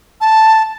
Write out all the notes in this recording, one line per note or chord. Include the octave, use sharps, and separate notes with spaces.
A5